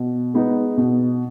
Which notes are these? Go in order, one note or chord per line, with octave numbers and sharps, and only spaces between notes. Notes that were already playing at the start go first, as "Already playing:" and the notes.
Already playing: B2
G#3 B3 D#4
B2